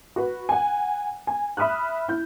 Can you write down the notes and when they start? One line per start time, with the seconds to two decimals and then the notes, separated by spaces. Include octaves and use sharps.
0.16 F#4 B4
0.49 F#5 G#5
1.27 G#5
1.57 E5 B5 D#6 F6 F#6
2.08 E4 G6